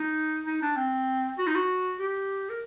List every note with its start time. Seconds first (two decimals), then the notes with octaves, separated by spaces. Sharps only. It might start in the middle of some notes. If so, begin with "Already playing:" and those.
Already playing: D#4
0.47 D#4
0.62 D4
0.76 C4
1.38 F#4
1.47 D#4
1.55 F#4
2.00 G4
2.50 A#4